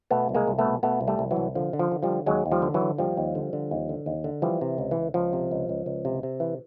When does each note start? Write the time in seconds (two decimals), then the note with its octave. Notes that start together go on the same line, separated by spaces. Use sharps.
0.11 B2 A3 B3
0.29 C2
0.35 G#3 A#3
0.47 C2
0.59 A3 B3
0.64 B2
0.83 B2 A3 B3
1.01 C2
1.07 G3 A3
1.19 C2
1.31 E3 F#3
1.36 C2
1.55 D3 F3
1.73 D3
1.79 F3
1.92 D3
2.03 F3 G3
2.09 D3
2.26 D#2 F#3 G#3
2.46 D#2
2.52 F3 G3
2.62 D3
2.74 E3 F#3
2.81 D3
2.98 D#2 F3 G3
3.17 D#2
3.35 D3
3.53 D3
3.71 D#2
3.89 D3
4.06 D#2
4.24 D3
4.42 E3 F3 G3
4.61 C3
4.78 C#2
4.91 E3
4.97 C#2
5.14 C#2 F3
5.33 C3
5.51 C#2
5.69 C#2
5.86 C#2
6.05 C3
6.23 C3
6.40 E3